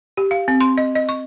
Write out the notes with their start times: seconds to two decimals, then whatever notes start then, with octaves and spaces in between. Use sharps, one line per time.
0.17 G4
0.31 F5
0.48 C4
0.61 C6
0.78 D#5
0.95 D#5
1.09 C#6